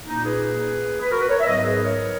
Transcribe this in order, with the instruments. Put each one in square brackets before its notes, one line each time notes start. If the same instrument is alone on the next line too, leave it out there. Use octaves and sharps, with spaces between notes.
[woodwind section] A#2 A#3 C#4 D#4
G#4 B4
B4
F#4 A#4
B4
A#4 C#5
E5
G#2 F#3 B3 B4 D#5
G#4 B4
A#4 C#5